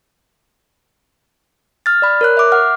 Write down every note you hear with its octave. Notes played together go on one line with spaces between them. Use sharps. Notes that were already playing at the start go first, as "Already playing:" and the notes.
F6 A6
D5 B5
A#4 C#5 F#6
E5 D6
F#5 F6